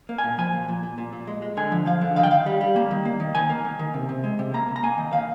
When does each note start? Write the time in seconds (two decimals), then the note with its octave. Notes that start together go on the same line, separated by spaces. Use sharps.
0.09 A#3
0.18 G#5
0.24 A#2
0.38 F3 G#5
0.53 A#2
0.68 A#2
0.83 A#2
0.98 A#2
1.13 A#2
1.27 G#3
1.42 G#3
1.57 D3 G#5
1.72 F3
1.86 F3 F5
2.01 D3
2.16 D#3 F5
2.23 G5
2.31 D#3 F5
2.46 G3
2.61 G3
2.76 A#3
2.91 D#3
3.05 A#3
3.20 D#3
3.35 D#3 G#5
3.50 A#3
3.64 D#3
3.79 D#3
3.94 C3
4.09 C3
4.24 G#3
4.39 C3
4.54 A#3 A#5
4.68 A#3
4.76 A#5
4.83 A#3 G#5
4.98 D#3
5.13 D#3 F5